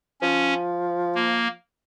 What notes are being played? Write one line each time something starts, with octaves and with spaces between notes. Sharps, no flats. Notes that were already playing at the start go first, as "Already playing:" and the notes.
F3 C#4
A#3